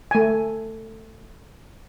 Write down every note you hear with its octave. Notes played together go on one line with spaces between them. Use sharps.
A3 G#5